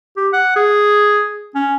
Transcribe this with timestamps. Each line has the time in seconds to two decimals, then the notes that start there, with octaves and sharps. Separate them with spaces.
0.17 G4
0.33 F#5
0.56 G#4
1.55 C#4